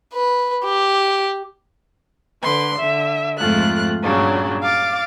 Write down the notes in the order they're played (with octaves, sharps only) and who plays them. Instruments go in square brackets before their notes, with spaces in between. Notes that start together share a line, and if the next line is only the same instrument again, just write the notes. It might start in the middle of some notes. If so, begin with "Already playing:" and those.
[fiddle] B4
G4
[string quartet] D3 B4 C6
D3 E5
F2 G#2 G#3 A3 F4 F#6
G2 A#2 C#3 F#3 D4
F5 D6 A6